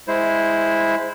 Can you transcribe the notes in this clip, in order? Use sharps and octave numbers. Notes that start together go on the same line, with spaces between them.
G#3 E4 C5